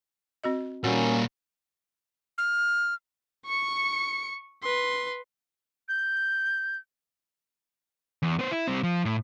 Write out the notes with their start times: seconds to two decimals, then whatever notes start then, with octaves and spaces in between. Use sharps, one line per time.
0.44 C4 F#4 D#5
0.84 A#2 G3 A#3 C#4 F#4 F#5 G#5
2.38 F6
3.46 C#6 C#7
4.63 B4 C6
5.89 G6
8.22 E2
8.39 B3 C5
8.51 E4
8.68 G3 C4
8.83 F3
9.05 A2